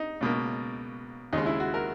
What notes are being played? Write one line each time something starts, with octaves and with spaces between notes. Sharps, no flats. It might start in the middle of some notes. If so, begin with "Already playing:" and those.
Already playing: D#4
C#2 B2 A#3
D#2 C#3 G#3 D#4
E4
F#4
A#4